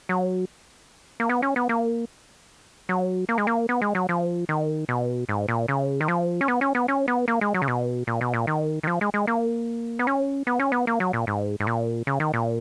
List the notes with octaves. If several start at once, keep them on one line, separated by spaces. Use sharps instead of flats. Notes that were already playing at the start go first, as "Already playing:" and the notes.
F#3
A#3
B3
C#4
B3
A#3
F#3
A#3
G#3
A#3
B3
G#3
F#3
F3
D#3
B2
G#2
A#2
C#3
D#3
F3
C#4
B3
C#4
B3
C#4
B3
A#3
G#3
F#3
C#3
B2
A#2
B2
A#2
D#3
D#3
F3
G#3
G#3
A#3
B3
C#4
B3
C#4
B3
A#3
F#3
A#2
G#2
G#2
A#2
C#3
D#3
A#2